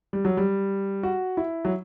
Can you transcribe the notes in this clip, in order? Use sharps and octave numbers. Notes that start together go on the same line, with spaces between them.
G3
F#3
G3
F#4
E4
F#3